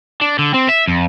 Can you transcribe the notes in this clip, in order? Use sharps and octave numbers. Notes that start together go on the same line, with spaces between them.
D4
D3
C4
E5
F2